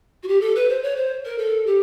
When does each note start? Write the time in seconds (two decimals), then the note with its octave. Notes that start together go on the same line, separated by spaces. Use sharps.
0.23 F#4
0.28 G4
0.41 A4
0.55 B4
0.69 C5
0.83 C#5
0.96 C5
1.25 A#4
1.38 A4
1.66 G4